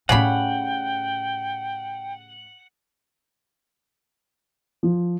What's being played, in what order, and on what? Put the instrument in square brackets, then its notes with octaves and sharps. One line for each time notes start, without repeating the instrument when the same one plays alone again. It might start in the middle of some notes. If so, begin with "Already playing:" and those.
[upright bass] A2 C#4 [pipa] C#3 G3 B5 [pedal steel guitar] F#5 [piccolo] G5
[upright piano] F3